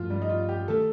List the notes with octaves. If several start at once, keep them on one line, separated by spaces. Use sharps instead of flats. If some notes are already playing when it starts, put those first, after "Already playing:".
Already playing: G2 F3 A3 F4
G3
D#4
F4
G4
D#3 A3 A4